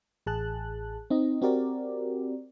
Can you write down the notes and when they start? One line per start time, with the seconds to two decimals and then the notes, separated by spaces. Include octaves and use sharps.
0.26 A1 G#4 A5 F#6
1.10 C4 D#4 D#5
1.42 C4 F#4 G4 A#4 D5